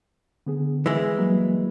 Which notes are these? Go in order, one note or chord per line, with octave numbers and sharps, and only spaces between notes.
D3 B3 G#4
E3 G#3
F#3 G3 A#3